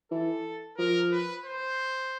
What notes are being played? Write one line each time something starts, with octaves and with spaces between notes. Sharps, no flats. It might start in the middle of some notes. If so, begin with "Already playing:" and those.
E3 A4
F3 A#4
B4
C5